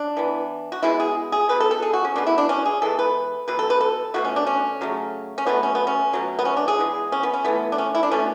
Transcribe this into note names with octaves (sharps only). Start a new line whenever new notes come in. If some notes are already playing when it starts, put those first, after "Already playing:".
Already playing: D4
E3 B3
F#4
B2 G#3 B3 E4
G#4
G#4
B2 F#3 B3 B4
A4
A4
G#4
F#4
C#4
B2 G#3 B3 D4
E4
D4
C#4
G#4
E3 G#3 B3 A4
B4
B2 F#3 B4
A4
B4
A4
B2 F#3 A3 F#4
C#4
D4
C#4
C#3 F#3 A3
C#4
B2 F#3 A3 B3
C#4
B3
C#4
B2 F#3 A3
B3
C#4
D4
G#4
E3 G#3 B3
C#4
B3
C#4
E3 A3 B3
D4
C#4
E4
D4
B2 A3 C#4